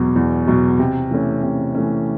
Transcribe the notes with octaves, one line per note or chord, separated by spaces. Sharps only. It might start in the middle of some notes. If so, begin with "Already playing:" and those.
Already playing: E2 B2 F#3
E2
B2 F#3
C3
E3 A3 C#4
C3
E3 A3 C#4